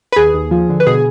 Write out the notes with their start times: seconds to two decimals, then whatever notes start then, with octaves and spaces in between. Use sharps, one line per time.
0.12 B4
0.16 D#2 G#4
0.34 D#2
0.51 F3
0.69 D3
0.80 B4
0.87 B2 G#4